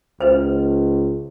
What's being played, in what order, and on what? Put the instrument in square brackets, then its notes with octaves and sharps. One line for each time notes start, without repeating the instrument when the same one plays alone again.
[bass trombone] C#2 [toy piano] B4 C5